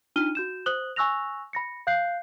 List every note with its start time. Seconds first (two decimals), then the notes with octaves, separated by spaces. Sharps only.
0.16 D4 D#4 F4 F6 D#7 G7
0.35 F#4 G6 E7
0.66 C5 D#6 F#6 F#7 G7
0.96 G#5 C#6 E6 F#6 A#6 F7
1.53 B5 A#6 C#7
1.87 F5 F#6 G6 C7